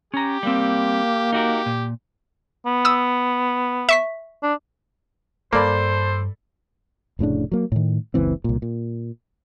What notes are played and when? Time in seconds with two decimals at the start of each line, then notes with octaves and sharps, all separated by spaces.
0.14 C#4 G4 A#5
0.43 G3 A#3 C4
1.33 D#4 F#4 G4 A#4
1.66 A#2
2.66 B3
2.85 D#6 E6
3.89 E5 C#6 B6
4.43 D4
5.53 G2 A#3 A4 C5 D5 B5
7.19 F1 A2 C#3 D4
7.52 F#3 A#3
7.72 A2 D#3
8.14 F#1 C#2 E3 C4
8.44 C2 A#2
8.62 A#2